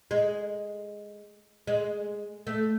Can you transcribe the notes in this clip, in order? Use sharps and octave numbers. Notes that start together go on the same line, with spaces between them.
G#3
G#3
A3